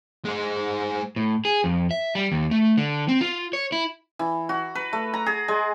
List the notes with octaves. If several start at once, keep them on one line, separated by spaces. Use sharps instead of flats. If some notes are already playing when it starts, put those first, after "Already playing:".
G#3 C5
A2
G#4
F2
E5
G3
D#2
A3
D3
C4
F4
C#5
E4
E3
F#4
B4
A3
A#5
G#4
G#3